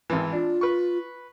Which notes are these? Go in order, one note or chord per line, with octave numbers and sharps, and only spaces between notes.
G#1 E3
D4 F4
B4 C#6